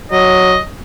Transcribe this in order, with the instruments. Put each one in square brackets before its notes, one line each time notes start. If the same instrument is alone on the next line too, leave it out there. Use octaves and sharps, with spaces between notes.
[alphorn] F#3 [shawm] D#5